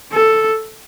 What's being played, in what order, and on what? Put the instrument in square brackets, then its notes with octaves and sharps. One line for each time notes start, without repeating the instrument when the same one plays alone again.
[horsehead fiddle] A4